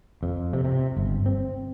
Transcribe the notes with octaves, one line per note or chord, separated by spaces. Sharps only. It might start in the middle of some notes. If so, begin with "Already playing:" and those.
F2
C3
C3
G1
C4